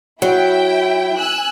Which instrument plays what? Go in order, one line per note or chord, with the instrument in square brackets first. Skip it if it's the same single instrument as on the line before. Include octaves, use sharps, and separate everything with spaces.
[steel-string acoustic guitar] F#3 [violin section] E4 G5
[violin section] G#5 E6 F#6